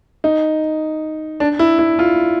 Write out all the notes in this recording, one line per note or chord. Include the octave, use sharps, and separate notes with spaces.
D#4
D4
E4
E4
F4